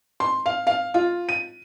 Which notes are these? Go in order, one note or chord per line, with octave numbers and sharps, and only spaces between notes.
C6
F5
F5
F4
D#7